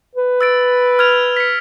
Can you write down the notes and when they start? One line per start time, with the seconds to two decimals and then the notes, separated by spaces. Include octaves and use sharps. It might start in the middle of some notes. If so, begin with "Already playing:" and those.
0.15 B4
0.41 E6 A6 D7
0.99 F6 G#6 F7
1.37 B6 C#7